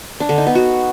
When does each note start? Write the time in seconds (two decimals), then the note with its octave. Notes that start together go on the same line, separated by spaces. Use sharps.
0.20 D4
0.29 D3
0.38 D#4
0.47 B3
0.55 F#4